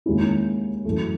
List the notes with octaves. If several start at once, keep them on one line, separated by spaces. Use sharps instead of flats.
D#2 D#3 G#3 C#4 E4
F#2 E3 A3